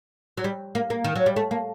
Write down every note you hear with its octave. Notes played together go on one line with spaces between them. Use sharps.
F#3
G3
A#3
A#3
D#3
F#3
G3
A3
A#3